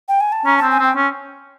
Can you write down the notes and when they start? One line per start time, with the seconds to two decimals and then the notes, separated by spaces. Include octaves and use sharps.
0.09 G5
0.21 G#5
0.32 A5
0.46 C#4 A#5
0.58 C4 A5
0.71 G#5
0.79 C4 G5
0.96 C#4